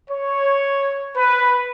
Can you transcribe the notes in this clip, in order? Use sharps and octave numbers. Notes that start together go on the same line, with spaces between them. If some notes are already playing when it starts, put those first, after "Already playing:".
C#5
B4